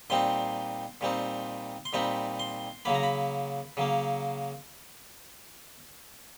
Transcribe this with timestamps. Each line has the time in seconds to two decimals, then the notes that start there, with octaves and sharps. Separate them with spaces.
0.10 A#2 G3 C4 D#4 C6
1.01 A#2 G3 C4 D#4
1.85 C6
1.93 A#2 G3 C4 D#4 B5
2.39 C6
2.85 C#3 F#3 A#3 B5
2.95 A#5
3.03 B5
3.77 C#3 F#3 A#3